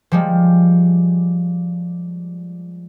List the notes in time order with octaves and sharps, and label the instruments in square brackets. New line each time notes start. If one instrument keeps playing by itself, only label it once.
[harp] F3 G3 G#3